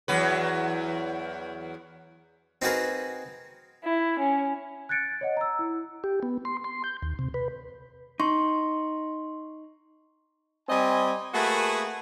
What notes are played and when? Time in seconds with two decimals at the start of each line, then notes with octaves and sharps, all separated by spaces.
0.08 E2 F#3 B4
2.62 C4 D#4 F#4 G#4 A#4 B4
3.83 E4
4.19 C#4
4.89 F#6 G#6 A6 C#7 D7
5.21 C#5 D#5 F#5
5.37 A#5 E6
5.59 E4
6.04 G4
6.23 B3
6.45 C6
6.64 C6
6.84 G6
7.03 D#2
7.19 C3
7.34 B4
8.20 D#4 C6 C#6
10.69 G3 C4 D#5 G#5
11.33 A3 A#3 F#4 G#4 B4